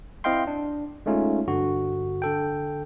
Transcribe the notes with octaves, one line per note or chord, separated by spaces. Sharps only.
C4 E4 D#5 F5 G5 C6
D4
G#3 A3 C#4 D#4 F4
G2 D3 F#4
D3 A4 G5